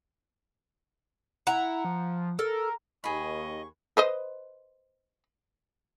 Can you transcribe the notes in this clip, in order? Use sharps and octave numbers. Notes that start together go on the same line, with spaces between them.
E4 F#5 A#5
F3
A4 A#4
D#2 G#4 D#5 B5 C#6
B4 C5 D#5